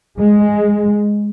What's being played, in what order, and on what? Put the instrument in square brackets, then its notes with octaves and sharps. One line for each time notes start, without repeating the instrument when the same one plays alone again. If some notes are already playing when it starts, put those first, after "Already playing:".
[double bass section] G#3